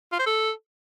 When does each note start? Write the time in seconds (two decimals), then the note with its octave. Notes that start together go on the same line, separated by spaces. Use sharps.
0.12 F4
0.19 C5
0.26 A4